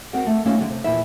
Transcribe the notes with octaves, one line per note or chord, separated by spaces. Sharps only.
C4 F#4 A#4 D#5 F#5
A3
A#3 C#4 D#4 F4 E5
D3 F#3 C#4
C3
E2 A#2 F3 A#3 E4 E5